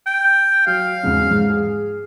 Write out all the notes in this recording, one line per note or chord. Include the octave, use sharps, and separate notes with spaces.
G5
F#3 F5
E2 G#2 C#3
G#2
G#4